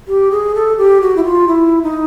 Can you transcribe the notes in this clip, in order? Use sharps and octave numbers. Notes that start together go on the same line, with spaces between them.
G4
G#4
A4
G4
F#4
E4
F4
E4
D#4